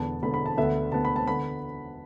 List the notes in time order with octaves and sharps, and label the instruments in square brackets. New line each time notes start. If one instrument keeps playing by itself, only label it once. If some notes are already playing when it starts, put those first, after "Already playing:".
Already playing: [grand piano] E1 E2 D3 B3 A5
E1 E2 D3 B3 B5
B5
A5
D2 D3 B3 E5
D2 D3 B3 A5
B5
A5
D3 B3 B5